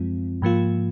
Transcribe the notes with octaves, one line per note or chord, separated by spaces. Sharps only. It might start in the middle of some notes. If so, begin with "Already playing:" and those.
Already playing: F#2 F3 G#3 C4 F4
G#2 F3 A#3 F4